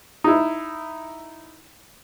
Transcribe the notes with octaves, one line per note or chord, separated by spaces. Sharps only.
D#4 E4